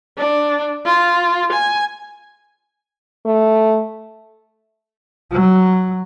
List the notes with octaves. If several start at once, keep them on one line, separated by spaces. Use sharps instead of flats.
D4
F4
G#5
A3
F#3